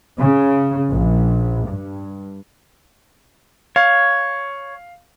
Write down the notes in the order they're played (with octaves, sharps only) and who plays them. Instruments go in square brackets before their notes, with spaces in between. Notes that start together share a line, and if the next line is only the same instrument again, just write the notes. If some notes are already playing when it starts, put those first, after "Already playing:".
[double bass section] C#3
A#1
G2
[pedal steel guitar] C#5 [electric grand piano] F5